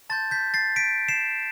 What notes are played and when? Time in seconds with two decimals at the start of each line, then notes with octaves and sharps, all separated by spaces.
0.10 A5 C6 G6 A6
0.31 G6 B6
0.54 A6 C7
0.76 B6 D7
1.08 C7 E7